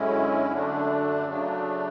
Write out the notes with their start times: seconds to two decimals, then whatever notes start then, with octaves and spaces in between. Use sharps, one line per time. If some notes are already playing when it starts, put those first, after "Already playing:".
Already playing: F#2 D3 G#3 C#4 E4
0.52 F#2 D3 A3 D4
1.26 C#3 F#3 A3 D4